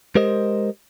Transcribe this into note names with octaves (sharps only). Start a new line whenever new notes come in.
G#3 G4 A#4 C5 D#5